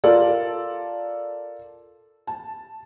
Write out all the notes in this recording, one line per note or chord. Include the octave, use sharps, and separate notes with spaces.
F4 A4 A#4 D5
A5